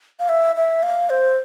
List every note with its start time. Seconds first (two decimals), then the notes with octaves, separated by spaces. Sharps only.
0.20 F5
0.29 E5
0.56 E5
0.83 F5
1.10 C5